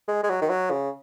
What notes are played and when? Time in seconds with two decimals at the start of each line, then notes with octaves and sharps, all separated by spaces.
0.08 G#3
0.23 G#3
0.30 F#3
0.41 D#3
0.49 F#3
0.71 C#3